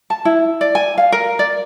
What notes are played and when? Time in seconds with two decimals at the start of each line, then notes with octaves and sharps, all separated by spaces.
0.10 A5
0.25 E4
0.61 D5
0.75 G#5
0.98 F5
1.12 A#4
1.39 D5